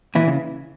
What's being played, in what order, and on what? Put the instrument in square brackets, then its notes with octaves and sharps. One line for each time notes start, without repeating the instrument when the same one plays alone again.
[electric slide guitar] A#2 E3 E4
C#3